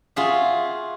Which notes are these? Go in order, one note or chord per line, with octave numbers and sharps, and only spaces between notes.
F4 F#4 G#4 E5